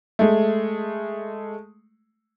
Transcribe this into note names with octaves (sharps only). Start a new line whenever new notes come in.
G#3 A3